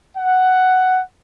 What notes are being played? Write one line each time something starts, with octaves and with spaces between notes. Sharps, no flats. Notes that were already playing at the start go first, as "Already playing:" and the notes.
F#5